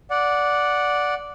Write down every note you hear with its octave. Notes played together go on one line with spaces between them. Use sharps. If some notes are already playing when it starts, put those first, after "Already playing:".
D5 F#5